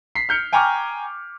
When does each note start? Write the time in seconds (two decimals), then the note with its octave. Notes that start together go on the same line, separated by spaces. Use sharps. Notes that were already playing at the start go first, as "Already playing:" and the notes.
0.15 B6 C7
0.29 F6 G6 C#7
0.53 G5 G#5 A#5 C#6 D6 F6